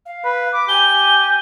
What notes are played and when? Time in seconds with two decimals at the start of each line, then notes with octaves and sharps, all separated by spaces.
0.06 F5
0.24 B4
0.52 D6
0.69 G4 G#5 G7